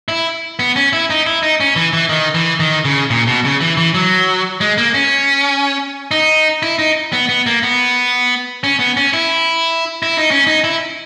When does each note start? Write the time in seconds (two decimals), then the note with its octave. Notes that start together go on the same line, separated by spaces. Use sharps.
0.08 E4
0.59 B3
0.76 C#4
0.93 E4
1.10 D#4
1.26 E4
1.43 D#4
1.60 C#4
1.76 E3
1.93 E3
2.09 D#3
2.34 E3
2.60 D#3
2.85 C#3
3.10 A#2
3.27 B2
3.45 C#3
3.60 E3
3.77 E3
3.94 F#3
4.61 G#3
4.78 A#3
4.94 C#4
6.11 D#4
6.63 E4
6.79 D#4
7.13 B3
7.29 B3
7.46 A#3
7.63 B3
8.64 C#4
8.79 B3
8.97 C#4
9.13 E4
10.03 E4
10.17 D#4
10.31 C#4
10.47 D#4
10.64 E4